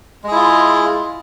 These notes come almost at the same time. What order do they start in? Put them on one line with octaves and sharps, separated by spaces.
G#3 G#4 E4 F4